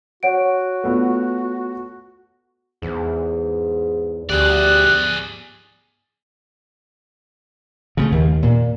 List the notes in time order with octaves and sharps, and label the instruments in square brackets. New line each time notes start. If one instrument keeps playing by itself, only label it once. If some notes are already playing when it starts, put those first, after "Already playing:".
[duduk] F#4 [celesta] C#5 F#5 D7
[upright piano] A3 B3 F4
[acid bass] E2 [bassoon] G#2
[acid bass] D2 [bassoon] G3 [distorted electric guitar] G#4 D5 [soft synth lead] F#6
[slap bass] C#3 G#3 A3
D#2
A#2